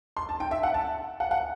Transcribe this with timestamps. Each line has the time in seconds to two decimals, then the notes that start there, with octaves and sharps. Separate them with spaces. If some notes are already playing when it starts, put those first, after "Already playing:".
0.17 C6
0.29 A5
0.40 G5
0.51 E5
0.63 F#5
0.74 A5
1.20 F#5
1.31 F#5